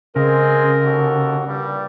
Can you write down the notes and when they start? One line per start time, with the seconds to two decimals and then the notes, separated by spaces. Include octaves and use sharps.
0.16 C#3 G#3 C4 G#4 A#4
0.84 D#2 F#4 A4
1.47 G2 A#2 G3